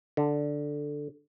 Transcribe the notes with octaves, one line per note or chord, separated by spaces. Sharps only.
D3